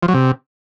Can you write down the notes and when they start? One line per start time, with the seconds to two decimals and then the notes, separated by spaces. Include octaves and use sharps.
0.03 F3
0.08 F#3
0.14 C3